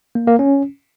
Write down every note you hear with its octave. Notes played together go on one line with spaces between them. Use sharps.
A#3
A#3
C#4